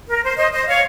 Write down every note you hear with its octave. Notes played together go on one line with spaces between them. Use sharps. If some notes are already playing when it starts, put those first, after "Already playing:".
A#4
C5
C5 D#5
C5 D#5
C#5 F5